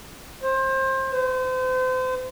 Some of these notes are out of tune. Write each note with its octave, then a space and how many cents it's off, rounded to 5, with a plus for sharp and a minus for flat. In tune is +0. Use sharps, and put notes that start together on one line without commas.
C5 +25
C5 -35